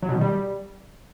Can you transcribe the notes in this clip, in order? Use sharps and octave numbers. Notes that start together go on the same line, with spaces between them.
F#3
B2
D#3
G3